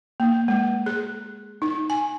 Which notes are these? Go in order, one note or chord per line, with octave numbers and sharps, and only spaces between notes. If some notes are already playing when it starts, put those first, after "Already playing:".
A#3
G#3
G#4
D#4
G#5